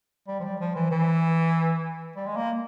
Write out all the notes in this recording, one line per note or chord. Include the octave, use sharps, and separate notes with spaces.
G3
F3
G3
F3
E3
E3
G3
G#3
A#3